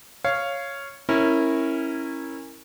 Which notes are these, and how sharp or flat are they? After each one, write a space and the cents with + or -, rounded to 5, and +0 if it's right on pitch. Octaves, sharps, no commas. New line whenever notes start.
C#5 +0 F5 -10
C#4 -20 E4 -10 A#4 -10